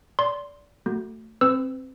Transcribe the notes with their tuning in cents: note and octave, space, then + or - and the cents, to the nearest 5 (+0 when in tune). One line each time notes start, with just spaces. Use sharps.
D5 -25 C6 +0
A3 +15 F#4 +0
C4 +10 B4 +45 E6 +0